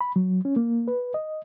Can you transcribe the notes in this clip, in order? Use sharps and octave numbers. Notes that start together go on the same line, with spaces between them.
B5
F#3
C#4
A#3
B4
D#5